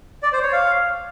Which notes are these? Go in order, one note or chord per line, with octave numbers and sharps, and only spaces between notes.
D5
C5
C#5
F5